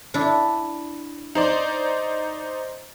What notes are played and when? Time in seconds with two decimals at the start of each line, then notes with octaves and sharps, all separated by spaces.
0.14 D4 E4
1.35 D#4 C5 D5